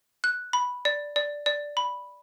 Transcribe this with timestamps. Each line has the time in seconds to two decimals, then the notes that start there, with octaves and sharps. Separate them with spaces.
0.24 F#6
0.53 B5
0.85 D5
1.16 D5
1.46 D5
1.77 B5